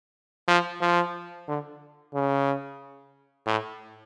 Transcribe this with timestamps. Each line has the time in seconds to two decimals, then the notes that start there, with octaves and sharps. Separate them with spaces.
0.48 F3
0.81 F3
1.48 D3
2.14 C#3
3.47 A2